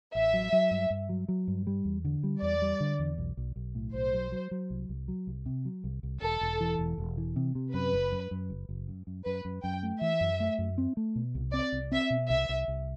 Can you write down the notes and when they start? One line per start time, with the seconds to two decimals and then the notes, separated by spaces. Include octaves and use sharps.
0.15 A1 E5
0.33 F#3
0.52 F#3
0.71 G2
0.90 G2
1.09 F#3
1.28 F#3
1.48 G2
1.67 G3
1.85 E2
2.05 D3
2.23 G3
2.42 E2 D5
2.62 G3
2.80 D3
2.99 E2
3.18 B1
3.37 B1
3.56 B1
3.75 A2
3.94 B1 C5
4.13 F#3
4.32 F#3
4.51 F#3
4.70 C2
4.89 C2
5.08 F#3
5.27 C2
5.46 C3
5.65 F#3
5.84 C2
6.03 C2
6.22 E1 A4
6.41 E1
6.60 E3
6.79 E1
6.98 E1
7.17 E3
7.36 C3
7.55 C3
7.74 F#2 B4
7.93 F#1
8.12 F#2
8.31 F#2
8.50 F#1
8.69 F#1
8.88 F#2
9.07 F#2
9.25 F#2 B4
9.45 F#2
9.64 F#2 G5
9.83 A3
10.01 E3 E5
10.21 F#2
10.40 A3
10.58 F#2
10.78 C4
10.97 A3
11.16 B2
11.35 C2
11.53 C4 D5
11.72 C2
11.91 C4 E5
12.10 B2
12.29 C2 E5
12.49 C2
12.68 C2